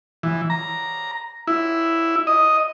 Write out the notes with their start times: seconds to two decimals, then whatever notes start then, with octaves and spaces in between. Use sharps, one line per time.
0.23 E3
0.50 A#5
1.47 E4
2.27 D#5